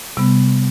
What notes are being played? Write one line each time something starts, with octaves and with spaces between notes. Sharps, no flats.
C3 G3 B3